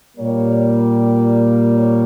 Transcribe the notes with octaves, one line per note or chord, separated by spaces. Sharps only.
A#2 G3 A#3 C#5
C#5